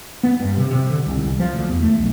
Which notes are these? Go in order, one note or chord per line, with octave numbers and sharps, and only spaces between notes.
B3
G2
C3
C3
D3
C2
C2
F3
D2
E2
A3
B1